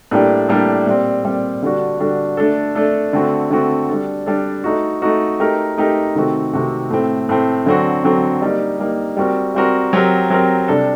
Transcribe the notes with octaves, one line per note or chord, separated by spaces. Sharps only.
A2 G3 A#3 D4 G4
A2 G3 A#3 D4 G4
A#2 G3 C4
A#2 G3 C4
D3 G3 D4 F#4
D3 G3 D4 F#4
A3 D4 A4
A3 D4 A4
D3 A3 C4 F#4
D3 A3 C4 F#4
G3 D4 A4
G3 D4 A4
A3 D#4 F#4
A3 D#4 F#4
A3 D#4 G4 A#4
A3 D#4 G4 A#4
C3 D#3 A3 C4 F#4
C3 D#3 A3 C4 F#4
A2 A3 C4
A2 A3 C4
D3 F#3 C4 F#4
D3 F#3 C4 F#4
G3 A#3 D#4 G4
G3 A#3 D#4 G4
G3 C4 F#4 A#4
G3 C4 F#4 A#4
F#3 C4 G4 A#4
F#3 C4 G4 A#4
C3 G3 D4 A4